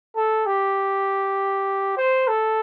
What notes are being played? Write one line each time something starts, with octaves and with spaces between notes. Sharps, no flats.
A4
G4
C5
A4